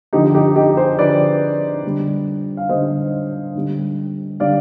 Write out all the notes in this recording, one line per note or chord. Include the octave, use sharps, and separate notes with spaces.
D3 F3 D#4 G4
D#4 G4
D#4 G4
G#4 C5
D3 F3 B4 D5
D3 G3
F5
D3 G3 C5 D#5
D3 G3
D3 G3 D5 F5